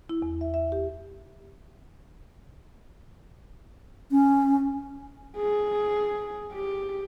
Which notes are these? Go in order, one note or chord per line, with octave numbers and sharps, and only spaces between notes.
E4
E2
E5
E5
G4
C#4
G#4
G4